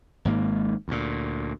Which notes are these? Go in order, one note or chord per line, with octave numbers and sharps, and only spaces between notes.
G#1 G#2 A#3
D2 A#2